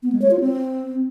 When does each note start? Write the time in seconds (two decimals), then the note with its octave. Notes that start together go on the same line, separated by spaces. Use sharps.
0.03 B3
0.12 G#3
0.22 C#5
0.31 F4
0.40 C4